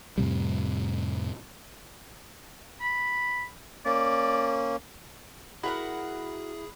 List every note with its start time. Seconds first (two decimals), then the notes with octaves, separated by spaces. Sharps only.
0.18 F2 A2 C3 G3
2.81 B5
3.86 A#3 C#4 D5
5.63 E4 F#4 G#4 A#4 F#5 B5